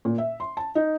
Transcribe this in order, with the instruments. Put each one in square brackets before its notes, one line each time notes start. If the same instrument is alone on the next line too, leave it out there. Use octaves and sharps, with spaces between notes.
[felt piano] A#2
E5
C6
A5
D#4